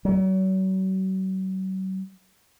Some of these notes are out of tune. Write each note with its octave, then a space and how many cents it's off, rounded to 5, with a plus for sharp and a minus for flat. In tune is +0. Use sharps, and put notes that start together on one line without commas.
F#3 +40